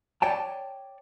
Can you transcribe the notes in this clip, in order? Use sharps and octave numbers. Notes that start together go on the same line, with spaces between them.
C#5 D5 G5 A5